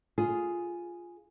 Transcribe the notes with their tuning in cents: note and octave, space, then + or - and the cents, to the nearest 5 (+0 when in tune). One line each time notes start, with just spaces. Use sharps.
F4 +0 G#4 +0